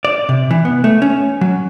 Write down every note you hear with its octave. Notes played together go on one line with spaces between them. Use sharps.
D5
C3
E3
B3
A3
C#4
F#3